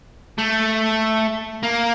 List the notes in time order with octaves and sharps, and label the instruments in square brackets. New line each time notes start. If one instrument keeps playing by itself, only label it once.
[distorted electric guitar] A3
A#3